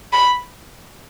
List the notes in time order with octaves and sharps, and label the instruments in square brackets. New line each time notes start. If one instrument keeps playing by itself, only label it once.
[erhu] B5